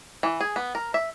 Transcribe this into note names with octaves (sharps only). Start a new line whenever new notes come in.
E3
G#4
B3
A#4
E5